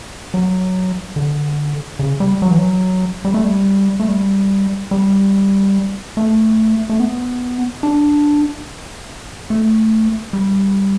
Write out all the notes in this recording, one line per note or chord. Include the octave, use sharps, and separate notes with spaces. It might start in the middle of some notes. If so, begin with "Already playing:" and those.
F#3
D3
C#3
G3
F#3
E3
F#3
G3
A3
G3
A3
G3
G3
A3
A3
B3
D4
A3
G3